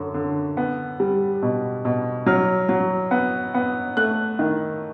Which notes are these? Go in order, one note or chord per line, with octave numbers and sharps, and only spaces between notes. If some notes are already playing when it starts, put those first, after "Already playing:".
Already playing: F#2 D3
D3
B3
G3
B2
B2
F#3 F6
F#3
B3
B3
A3 F#6
D#3